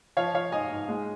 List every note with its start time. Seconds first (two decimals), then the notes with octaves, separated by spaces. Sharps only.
0.17 F3 C#5 F5
0.34 F3 C#5 F5
0.52 G#2 D#5 G#5
0.70 G#2
0.89 G#3